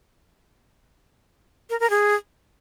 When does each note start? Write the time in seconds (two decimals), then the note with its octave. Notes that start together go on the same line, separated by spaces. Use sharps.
1.70 A#4
1.80 A#4
1.90 G#4